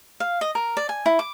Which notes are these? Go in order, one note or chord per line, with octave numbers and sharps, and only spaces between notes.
F5
D#5
A#4
D5
G#5
E4
D6